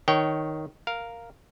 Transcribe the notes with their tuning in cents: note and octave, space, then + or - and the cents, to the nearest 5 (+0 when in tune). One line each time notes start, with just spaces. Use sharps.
D#3 +5 C#5 +0 G5 -25
A#4 +0 F5 +0